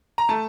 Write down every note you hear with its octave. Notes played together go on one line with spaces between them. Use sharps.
A#5
A3 A5